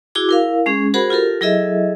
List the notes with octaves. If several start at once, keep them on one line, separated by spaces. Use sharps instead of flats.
E4 F#4 G#4 D6
E4 A#4 F5
G#3 C#4 G#4
F#4 G#4 A#4 C5 F#5 B5
F4 G4 A4 A#4
F#3 E4 G#4 A4 D#5 E5